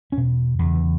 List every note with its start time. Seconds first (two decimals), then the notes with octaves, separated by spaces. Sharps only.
0.12 E2 C#4
0.17 B2
0.59 E2 C#3
0.75 E3